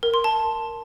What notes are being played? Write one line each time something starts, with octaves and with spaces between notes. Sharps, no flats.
A#4
C6
A5